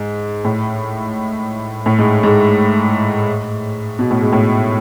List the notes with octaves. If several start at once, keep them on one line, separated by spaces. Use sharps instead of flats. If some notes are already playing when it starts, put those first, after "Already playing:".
Already playing: G#2
A2
A2
G#2
G#2
B2
A2
G#2
A2